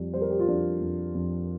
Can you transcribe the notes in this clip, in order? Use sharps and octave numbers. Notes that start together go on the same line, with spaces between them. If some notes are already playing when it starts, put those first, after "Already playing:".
Already playing: F2 G3
G3 C5
A#4
G4
F4
F2 D4
F2
F2